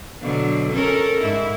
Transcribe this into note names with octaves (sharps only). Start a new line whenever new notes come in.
B2 D3 F#3
C#4 A4 A#4
G#2 E4